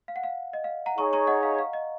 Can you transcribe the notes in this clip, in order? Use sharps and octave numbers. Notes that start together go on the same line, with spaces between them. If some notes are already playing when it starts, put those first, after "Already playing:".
F5
F#5
F5
D#5
F5
F#5 A#5
D#4 G#4 C#5 A#5 C#6
A#5 C#6
D#5 F#5
F5
F5
D#5